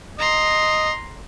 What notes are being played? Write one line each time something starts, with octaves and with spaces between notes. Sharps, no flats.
D#5 A#5 C6